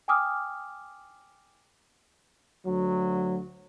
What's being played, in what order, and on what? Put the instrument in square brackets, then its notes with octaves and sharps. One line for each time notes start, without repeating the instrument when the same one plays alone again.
[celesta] G5 G#5 D6 D#6 F6
[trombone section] D2 F#3